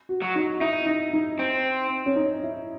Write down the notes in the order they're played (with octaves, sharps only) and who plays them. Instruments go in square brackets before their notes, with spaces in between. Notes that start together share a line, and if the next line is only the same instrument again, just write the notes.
[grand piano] F#4
[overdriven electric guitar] F#3
[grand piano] D#4
[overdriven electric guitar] D#4 [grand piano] E4
[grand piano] D#4
D#4
[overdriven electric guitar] C4
[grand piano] C#4
D#4
E4